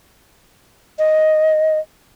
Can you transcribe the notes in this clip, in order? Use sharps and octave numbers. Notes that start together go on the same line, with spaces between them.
D#5